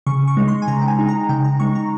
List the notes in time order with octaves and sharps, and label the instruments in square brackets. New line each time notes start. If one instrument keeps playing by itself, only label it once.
[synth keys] C#3 C#6
C#6
G#3 D#4
C6
G#5
C#3 A#5
G5
G#5
G#3 D#4
A#5
C#3 G5
A#5
G#3 D#4 C#6
A#5